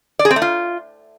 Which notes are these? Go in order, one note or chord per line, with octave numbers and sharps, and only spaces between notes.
D5
G#4
C4
A3
F4